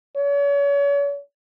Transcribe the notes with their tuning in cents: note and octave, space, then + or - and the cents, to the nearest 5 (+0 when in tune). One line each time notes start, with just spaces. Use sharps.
C#5 +40